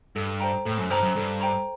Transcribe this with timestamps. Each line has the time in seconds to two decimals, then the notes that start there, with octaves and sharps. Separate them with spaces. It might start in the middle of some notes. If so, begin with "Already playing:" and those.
0.16 G2 A4
0.40 C5 G5 A#5
0.66 A2 A4
0.78 F#2
0.90 G2 C5 G5 A#5
1.03 F#2
1.16 G2 A4
1.41 C5 G5 A#5